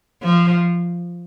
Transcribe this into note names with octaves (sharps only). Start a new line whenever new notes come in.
F3